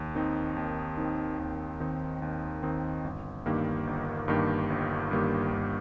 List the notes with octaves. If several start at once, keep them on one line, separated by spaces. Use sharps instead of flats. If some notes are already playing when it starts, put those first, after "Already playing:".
Already playing: D#2
D#3 C4 D#4
D#2
D#3 C4 D#4
D#2
D#3 C4 D#4
D#2
D#3 C4 D#4
G1
G2 D#3 A#3 G4
G1
G2 D#3 A#3 G4
G1
G2 D#3 A#3 G4
G1